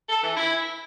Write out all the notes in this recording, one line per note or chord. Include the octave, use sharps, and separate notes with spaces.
A4
E3
E4